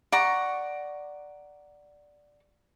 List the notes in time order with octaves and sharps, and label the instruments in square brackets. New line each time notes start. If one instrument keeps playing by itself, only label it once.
[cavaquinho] D5 F#5 A#5 C#6